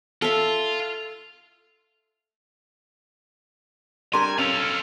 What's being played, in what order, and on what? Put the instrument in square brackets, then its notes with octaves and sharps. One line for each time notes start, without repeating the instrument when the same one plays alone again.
[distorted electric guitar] F4 [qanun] A4 E5
[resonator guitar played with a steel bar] G3 D4 A#4 [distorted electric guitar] G#5 [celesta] C6
[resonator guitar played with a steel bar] C#4 [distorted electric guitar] A4 F5